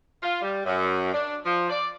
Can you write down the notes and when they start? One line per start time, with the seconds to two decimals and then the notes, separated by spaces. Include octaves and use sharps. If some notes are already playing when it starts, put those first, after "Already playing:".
0.23 F4
0.42 G3
0.65 F#2
1.13 D4
1.46 F3
1.70 D5